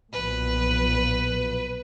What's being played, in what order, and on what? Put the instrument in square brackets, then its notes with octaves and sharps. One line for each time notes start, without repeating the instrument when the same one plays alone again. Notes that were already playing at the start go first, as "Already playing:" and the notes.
[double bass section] B1 A#2 F3 [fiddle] B4